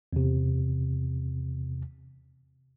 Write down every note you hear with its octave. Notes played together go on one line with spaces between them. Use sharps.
E2 C3